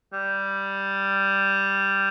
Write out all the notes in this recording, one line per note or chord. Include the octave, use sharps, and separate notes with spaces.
G3